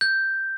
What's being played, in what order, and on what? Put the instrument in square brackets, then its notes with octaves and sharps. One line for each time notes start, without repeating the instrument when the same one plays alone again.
[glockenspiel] G6